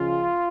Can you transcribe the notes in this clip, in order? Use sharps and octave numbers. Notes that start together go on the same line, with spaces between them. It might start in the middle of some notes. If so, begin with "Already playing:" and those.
Already playing: C#2 C#3 F3 G#3 F4